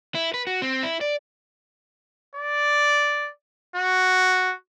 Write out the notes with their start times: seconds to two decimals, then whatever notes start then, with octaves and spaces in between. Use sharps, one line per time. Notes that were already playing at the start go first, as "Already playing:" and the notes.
0.15 E4
0.34 B4
0.47 F#4
0.62 C4
0.83 E4
1.01 D5
2.35 D5
3.76 F#4